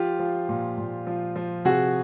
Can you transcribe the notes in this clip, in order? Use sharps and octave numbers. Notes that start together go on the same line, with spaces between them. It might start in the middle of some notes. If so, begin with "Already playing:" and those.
Already playing: F3 F4 G4
F3
A#2
A#2
F3
F3
C3 F#4 G#4